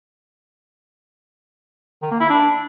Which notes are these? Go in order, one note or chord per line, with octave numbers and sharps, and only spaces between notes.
D#3
A#3
E4
D4